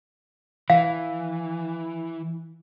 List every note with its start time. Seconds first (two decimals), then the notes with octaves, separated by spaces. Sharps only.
0.70 E3 F5